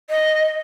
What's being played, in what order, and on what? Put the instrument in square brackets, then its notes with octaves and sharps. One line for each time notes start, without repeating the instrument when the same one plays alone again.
[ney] D#5